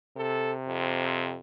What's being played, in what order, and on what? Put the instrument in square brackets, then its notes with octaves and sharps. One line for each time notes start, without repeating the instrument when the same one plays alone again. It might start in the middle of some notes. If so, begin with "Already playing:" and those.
[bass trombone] C3 [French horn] A4
[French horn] F2